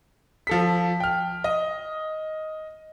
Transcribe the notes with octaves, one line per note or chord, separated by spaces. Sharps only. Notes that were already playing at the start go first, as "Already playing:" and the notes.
F3 A4 B6
G5 F6
D#5